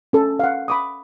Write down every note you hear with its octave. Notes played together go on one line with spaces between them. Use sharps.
C#4 A4
F5 F#5
B5 D6 D#6